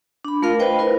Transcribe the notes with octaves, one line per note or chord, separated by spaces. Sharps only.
D4 B5
A3 F4 A#4 F5
B4 C5 D#5 G5
E4 A#4